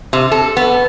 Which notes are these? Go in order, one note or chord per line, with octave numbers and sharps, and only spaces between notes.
C3
A4
B3